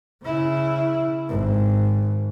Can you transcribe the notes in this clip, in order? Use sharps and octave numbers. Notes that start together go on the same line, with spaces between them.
C#3 E4
G#1